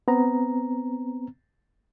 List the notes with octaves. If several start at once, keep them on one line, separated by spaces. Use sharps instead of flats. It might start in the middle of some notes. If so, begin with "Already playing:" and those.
B3 C4 A#5